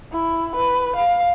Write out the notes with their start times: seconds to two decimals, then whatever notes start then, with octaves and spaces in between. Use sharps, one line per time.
0.12 E4
0.55 B4
0.95 F5